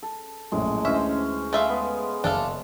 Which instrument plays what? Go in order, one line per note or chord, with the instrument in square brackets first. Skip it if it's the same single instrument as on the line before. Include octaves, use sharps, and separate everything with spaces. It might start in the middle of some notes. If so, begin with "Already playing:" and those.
[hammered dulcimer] A4
[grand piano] A#1 F#2 A2 [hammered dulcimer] G#3
[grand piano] D2 E3 D#5 [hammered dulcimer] C#4 C5 [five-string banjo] E5
[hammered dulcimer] G#3 [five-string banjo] A3 E5 F5
[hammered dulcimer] B3
[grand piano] F#1 [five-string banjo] D4 A4 F5